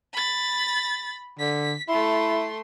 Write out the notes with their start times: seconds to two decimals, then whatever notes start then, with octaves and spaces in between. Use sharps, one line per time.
0.13 B5 A6
1.39 D3 B6
1.89 A3 E4 C6